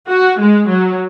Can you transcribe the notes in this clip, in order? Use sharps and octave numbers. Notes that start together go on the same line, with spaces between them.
F#4
G#3
F#3